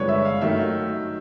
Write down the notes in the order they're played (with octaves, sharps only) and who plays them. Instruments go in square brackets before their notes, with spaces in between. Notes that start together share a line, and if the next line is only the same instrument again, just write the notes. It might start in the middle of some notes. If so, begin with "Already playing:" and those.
Already playing: [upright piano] G2 D3 F3 G#3 C4 [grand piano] B4 C#5
[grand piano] E5
F5
[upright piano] D#3 F#3 A3 [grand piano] E5